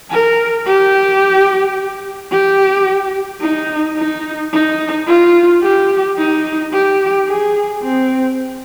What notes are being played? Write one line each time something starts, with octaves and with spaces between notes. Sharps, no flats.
A#4
G4
G4
D#4
D#4
D#4
F4
G4
D#4
G4
G#4
C4